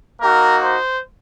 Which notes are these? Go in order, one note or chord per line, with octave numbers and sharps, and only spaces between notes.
A#3 D#4 F#4 A#4
C5